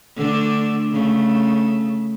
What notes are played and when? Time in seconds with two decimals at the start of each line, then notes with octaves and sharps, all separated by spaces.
0.16 D3 A3 D4
0.92 C#3 A3